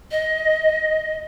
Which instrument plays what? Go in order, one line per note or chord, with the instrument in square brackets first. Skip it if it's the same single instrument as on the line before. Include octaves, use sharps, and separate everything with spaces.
[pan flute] D#5